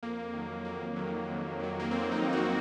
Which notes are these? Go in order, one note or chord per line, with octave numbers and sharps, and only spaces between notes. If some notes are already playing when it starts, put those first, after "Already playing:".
F2 A#3
D#3 F#3
F2 A#3
D#3 F#3
F2
D#3 F#3
A#3
F2 C4
D#4
D#3 F#3
F#4